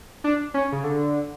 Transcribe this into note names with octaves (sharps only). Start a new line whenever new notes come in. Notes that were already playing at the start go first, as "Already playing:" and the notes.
D4
C#4
C#3
D3